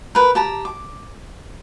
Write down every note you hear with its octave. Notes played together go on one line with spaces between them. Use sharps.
A#4 B4
G4 A5 A#5
D6